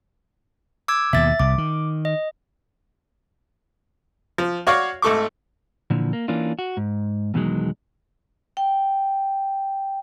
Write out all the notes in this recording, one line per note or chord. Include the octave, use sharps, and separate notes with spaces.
D6 E6 G#6
D#2 B2 E5 A6
C2 D6
D#3
D#5
F3
F#4 C#5 D5 F5 C#6
G#1 A3 A4 C#6 D6
A#2 D3 E3 F3
A#3
E3 A#3 C#4 D4 F4
F#4
G#2
E2 B2 D#3 F#3 G#3
G5